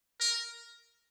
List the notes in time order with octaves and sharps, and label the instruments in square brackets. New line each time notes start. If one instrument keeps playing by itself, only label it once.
[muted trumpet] A#4